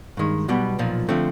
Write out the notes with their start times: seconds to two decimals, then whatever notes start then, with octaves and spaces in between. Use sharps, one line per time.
0.17 G2 D#3 G#3
0.48 B1 B2 G3 B3
0.79 B1 A#2 F3
1.09 D3 F3 A3 C4